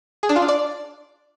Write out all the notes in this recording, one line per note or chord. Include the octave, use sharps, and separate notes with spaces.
G#4
D4
F4
D4
D5